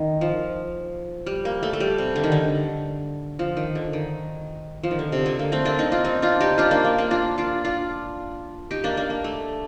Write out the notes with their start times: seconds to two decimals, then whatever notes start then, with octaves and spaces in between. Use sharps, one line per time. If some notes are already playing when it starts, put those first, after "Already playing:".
Already playing: D#3
0.21 F3
1.26 G3
1.45 A#3
1.63 A3
1.73 A3
1.80 G3
1.98 C3
2.16 D3
2.24 D#3
2.32 D3
3.39 F3
3.57 D#3
3.75 D3
3.93 D#3
4.84 F3
4.91 D#3
4.99 D3
5.12 C3
5.26 D3
5.39 A#3
5.52 A3 C4
5.65 A#3 D4
5.78 C4 D#4
5.92 D4 F4
6.05 C4 D#4
6.22 D4 F4
6.40 D#4 G4
6.58 D4 F4
6.71 A#3 D4
6.84 A#3
6.98 A#3 D4
7.11 D4 F4
7.38 D4 F4
7.65 D4 F4
8.71 D#4 G4
8.84 A#3 D4
8.97 A#3 D4
9.10 A#3
9.24 A3